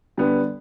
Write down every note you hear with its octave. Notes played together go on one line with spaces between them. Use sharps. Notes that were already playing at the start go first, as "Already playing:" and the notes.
D3 G3 B3